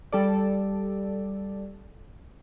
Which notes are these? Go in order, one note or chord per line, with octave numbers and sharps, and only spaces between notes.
G3 A4 D5